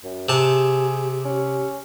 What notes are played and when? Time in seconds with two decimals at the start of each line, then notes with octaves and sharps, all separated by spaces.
0.04 F#2
0.29 C3 G4 G#4 A5
1.25 C#4